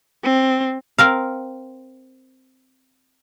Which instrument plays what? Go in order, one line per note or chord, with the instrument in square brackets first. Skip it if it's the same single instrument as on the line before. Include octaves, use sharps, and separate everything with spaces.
[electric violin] C4
[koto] C4 A#4 F5